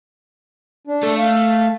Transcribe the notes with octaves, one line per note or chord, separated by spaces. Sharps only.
D4
A3 A4
F5